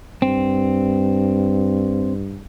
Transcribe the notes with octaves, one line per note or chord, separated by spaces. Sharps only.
G2 C4